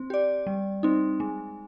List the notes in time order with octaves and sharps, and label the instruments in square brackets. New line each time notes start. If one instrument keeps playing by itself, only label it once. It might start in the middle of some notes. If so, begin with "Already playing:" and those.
Already playing: [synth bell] C4
G4 D5
G3
C4 D#4
G#3